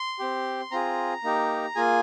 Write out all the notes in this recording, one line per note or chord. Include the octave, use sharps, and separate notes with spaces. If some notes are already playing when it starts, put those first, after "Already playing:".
Already playing: C6
C4 G4
C4 F4 G#4 A#5
A#3 D#4 G4
A#3 F4 G#4 G#5